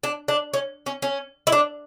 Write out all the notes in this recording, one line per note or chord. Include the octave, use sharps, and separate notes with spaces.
D4
D4
C#4
C#4
C#4
E4
D4